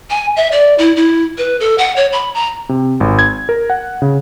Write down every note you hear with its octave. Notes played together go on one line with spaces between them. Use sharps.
G#5
E5
D5
E4
E4
B4
A4
F#5
C#5
B5
A#5
C3
G#1
G#6
A#4
F#5
C#3